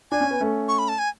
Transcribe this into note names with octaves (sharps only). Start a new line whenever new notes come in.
D4 G#5
C#4
B3
A3 C#4
C#6
B5
A5
G#5